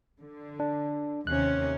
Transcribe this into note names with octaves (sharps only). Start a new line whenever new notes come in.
D3
D4
D#2 C3 C#4 F#6